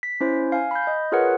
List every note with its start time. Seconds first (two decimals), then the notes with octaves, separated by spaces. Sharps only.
0.03 B6
0.21 C#4 E4 C5
0.52 F5 G#5
0.71 B5 G6
0.87 D#5
1.12 F4 G#4 A#4 B4 C#5 F#5